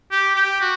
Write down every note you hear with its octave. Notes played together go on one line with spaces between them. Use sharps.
G4
G4
F#4